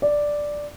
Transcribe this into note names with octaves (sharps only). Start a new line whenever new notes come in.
D5